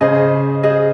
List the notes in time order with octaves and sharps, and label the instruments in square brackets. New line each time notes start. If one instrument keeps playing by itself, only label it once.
[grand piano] C#3 [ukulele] G#4 C5 D#5
[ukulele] G#4 C5 D#5